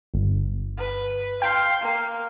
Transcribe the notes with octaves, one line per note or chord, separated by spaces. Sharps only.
G1
B4
F5 G5 C6
A#3